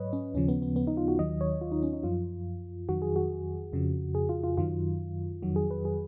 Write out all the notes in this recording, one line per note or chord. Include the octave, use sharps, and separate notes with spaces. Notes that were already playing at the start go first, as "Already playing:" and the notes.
Already playing: G#2 F#3 B4 C#5 D#5
C#4
D#2 C#3 F3 C#4
B3
B3
B3
D#4
F4
F#4
D#2 D#3 F#3 D#5
C#5
F4
D#4
C#4
D#4
F#2 F3 F4
F2 D#3 F#3 F#4
G#4
F#4
F2 C#3 F3
G#4
F4
F4
F#2 D#3 F#3 F4
F2 D#3 F#3 F#4
G#4
B4
G#4